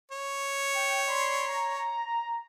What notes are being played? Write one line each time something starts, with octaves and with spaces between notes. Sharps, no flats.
C#5
G5
D5 B5 C6
A#5